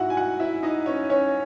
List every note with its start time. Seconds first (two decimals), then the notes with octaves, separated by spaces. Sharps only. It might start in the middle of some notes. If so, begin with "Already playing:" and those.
Already playing: G#2 D#4 E4 F#4 E5 F#5
0.10 G#5
0.17 F#4 F#5
0.40 E4 E5
0.63 D#4 D#5
0.86 C#4 C#5
1.10 C#4 C#5